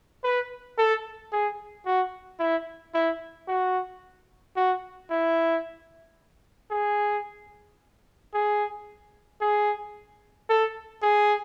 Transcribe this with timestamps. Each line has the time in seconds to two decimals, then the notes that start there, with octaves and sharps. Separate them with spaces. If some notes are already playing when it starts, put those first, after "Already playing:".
0.24 B4
0.78 A4
1.32 G#4
1.86 F#4
2.40 E4
2.94 E4
3.48 F#4
4.56 F#4
5.10 E4
6.71 G#4
8.33 G#4
9.41 G#4
10.49 A4
11.02 G#4